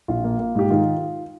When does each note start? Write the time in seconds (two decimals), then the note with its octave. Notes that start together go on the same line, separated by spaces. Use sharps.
0.08 A#1 F4
0.24 A#3
0.39 A#3
0.55 G#2 G4
0.70 D#3 F4